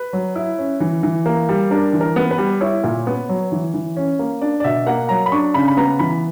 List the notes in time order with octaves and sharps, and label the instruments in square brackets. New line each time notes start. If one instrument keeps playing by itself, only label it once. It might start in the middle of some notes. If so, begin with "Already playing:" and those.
Already playing: [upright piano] B4
F#3
E4
C#4
E3
E3
A#3
G3
D4 A#4
E3
A#4
B3
B4
G3
E4 C#5
A#2
B3
F#3
E3
E3
C#4
A#3
D4 D5
D5
B2 E5
A#3 F#5
F#3 A#5
B5
D4 C#6
C#3 B5
B5
B3 A#5
E3 B5